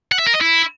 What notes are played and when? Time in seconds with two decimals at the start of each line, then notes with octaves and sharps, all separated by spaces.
0.12 F#5
0.19 E5
0.27 A#4
0.34 D#5
0.41 E4